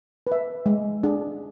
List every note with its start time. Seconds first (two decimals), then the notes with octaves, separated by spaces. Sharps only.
0.27 B4
0.32 E5
0.66 G#3
1.03 D4 G#4